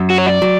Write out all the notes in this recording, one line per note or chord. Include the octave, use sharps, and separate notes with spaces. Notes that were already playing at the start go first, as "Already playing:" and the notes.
Already playing: F#2 F#3
F#4
C#5
D5
F#3